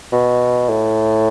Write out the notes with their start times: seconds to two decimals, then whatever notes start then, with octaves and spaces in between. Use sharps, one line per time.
0.12 B2
0.69 A2